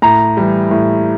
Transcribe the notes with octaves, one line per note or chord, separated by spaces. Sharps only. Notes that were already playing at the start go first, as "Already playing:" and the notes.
A2 A#5
E3 G3
A2